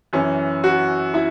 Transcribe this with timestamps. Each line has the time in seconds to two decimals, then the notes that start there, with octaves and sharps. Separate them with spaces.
0.13 F#2 E3 C#4
0.64 F#4
1.14 E4